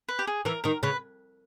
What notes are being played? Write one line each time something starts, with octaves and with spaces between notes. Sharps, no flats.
B4
G4
G#4
E3 A#4
D#3 A#4
C#3 B4